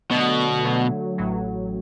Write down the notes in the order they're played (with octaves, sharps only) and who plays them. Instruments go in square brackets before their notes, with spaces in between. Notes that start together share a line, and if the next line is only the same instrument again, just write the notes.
[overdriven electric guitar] B2 [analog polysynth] D3 F#3 A3
[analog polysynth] D3 F#3 A3
A1 A2 F#3